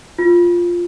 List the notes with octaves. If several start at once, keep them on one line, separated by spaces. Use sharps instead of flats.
F4